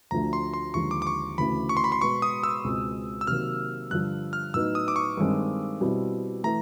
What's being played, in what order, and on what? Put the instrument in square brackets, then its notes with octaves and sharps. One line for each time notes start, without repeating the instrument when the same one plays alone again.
[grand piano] D2 D3 F3 A3 [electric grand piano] A#5
[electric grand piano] C6
C6
[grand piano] D#2 D3 F3 G#3 [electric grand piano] C#6
[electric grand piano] D6
D6
C#6
[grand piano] D2 C#3 E3 A3 C#4 [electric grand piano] B5
[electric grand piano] C#6
C6
B5
C6
[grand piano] B2 G#3 B3 [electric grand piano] C#6
[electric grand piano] D#6
E6
[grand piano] C#2 B2 G#3 C4
[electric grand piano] E6
[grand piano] C3 D#3 F#3 A#3 [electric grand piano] F6
[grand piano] G2 D3 F3 [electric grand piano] F#6
[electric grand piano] F6
[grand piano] A2 F#3 B3 D#4 [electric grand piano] E6
[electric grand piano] D#6
D6
C#6
[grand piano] G2 D#3 G#3 C4
B2 G3 C4 E4
[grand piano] E3 A3 [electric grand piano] A#5